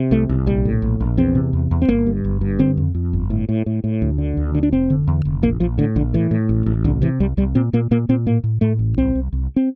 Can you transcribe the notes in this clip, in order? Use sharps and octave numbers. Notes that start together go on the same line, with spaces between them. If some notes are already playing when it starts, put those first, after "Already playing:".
Already playing: C3
C2 A3
C2
A#1 G3
A2
A#1
A#1
E2 C4
C3
E2
E2
C4
G1 A#3
G2
G1
G2
D3 C4
F2
F2
G1
A2
A2
A2
A2
D2
D3
D2
D3
D4
F1 C4
D3
E2
F1
A#1 A#3
A#1 F3
A2 D3
A#1 D3
A2 E3
A2
A1
A1
C2 D3
C3 E3
C2 G3
C2 G3
A#2 C4
A#2 A#3
A#2 A#3
A#2 C4
A2 A#3
A2
A2 A3
A1
C2 C4
C2
C2
C4